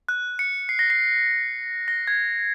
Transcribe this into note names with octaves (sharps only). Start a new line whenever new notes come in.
F#6
C#7
C7
A#6
C7
A#6
G#6